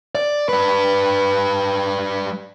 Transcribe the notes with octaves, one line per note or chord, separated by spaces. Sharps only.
D5
G3 B4